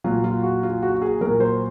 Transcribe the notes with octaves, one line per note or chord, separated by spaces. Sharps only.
A#2 F#3 F4
F4
F#4
F4
F#4
F#4
G#4
A#2 F#3 A#4
C5